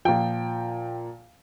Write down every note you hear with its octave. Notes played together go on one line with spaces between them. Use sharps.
A#2 F3 G5